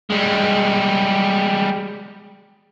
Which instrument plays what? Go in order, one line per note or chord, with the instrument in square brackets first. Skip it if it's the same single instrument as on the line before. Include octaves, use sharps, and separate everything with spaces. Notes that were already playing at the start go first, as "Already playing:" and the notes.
[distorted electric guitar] G3 G#3